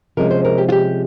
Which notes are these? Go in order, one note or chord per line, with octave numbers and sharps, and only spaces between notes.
C3 F3 G#3 C#4 A#4
C5
A#4
G4
F4
G4